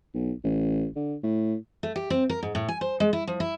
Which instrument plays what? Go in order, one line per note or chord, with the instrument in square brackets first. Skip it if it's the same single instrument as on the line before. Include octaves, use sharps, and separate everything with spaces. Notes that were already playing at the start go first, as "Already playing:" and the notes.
[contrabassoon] B1
A1
D3
A2
[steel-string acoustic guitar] A3
G4
C4
A#4
G#2
A2
G#5
C5
G#3
E4
F3
E4